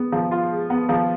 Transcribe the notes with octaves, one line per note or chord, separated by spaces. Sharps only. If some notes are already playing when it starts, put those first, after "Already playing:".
Already playing: G#3 B3
F3
F4
G#3
B3
F3